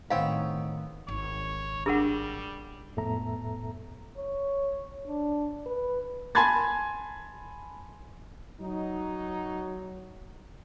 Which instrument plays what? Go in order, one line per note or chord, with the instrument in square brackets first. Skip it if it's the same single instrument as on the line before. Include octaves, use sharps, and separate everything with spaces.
[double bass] A2 D#3 [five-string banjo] B3 C4 C#5 [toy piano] F5
[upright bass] G#1 [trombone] C#5
[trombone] G3 [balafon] D4 [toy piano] G#4 A#4 F#5
[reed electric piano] F2 A2 B3 A4 E5 A#5
[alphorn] C#5
D4
B4
[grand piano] G#5 A5 B5 C6 G#6 A6
[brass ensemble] F#3 D#4